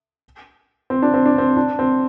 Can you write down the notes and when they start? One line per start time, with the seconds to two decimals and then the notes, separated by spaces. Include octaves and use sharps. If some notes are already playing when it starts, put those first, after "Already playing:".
0.90 C4
1.02 D4
1.14 C4
1.26 D4
1.38 C4
1.57 D4
1.79 C4